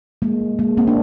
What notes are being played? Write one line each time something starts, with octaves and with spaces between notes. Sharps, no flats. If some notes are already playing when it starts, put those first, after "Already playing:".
G#3 A#3
G#3 A#3
A#3 C4
D4